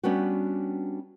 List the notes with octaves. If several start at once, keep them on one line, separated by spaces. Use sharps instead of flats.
G3 B3 C#4 D4 F#4